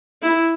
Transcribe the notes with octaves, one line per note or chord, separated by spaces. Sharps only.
E4